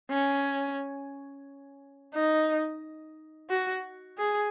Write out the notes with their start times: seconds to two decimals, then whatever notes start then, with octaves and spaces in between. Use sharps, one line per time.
0.11 C#4
2.15 D#4
3.50 F#4
4.18 G#4